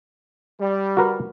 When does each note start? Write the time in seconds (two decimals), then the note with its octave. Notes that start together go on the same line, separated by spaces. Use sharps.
0.60 G3
0.97 F#4 A#4 B4